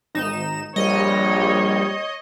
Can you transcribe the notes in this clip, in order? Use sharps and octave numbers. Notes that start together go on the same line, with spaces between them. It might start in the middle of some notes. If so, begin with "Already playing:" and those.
G#1 D#4 E7
A#1 G3 C#5 D#5